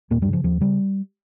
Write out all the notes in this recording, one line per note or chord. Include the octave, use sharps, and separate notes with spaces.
D#2 A#2 A#3
G2 G3
C#3 F3
D#2 F3
C#3 G3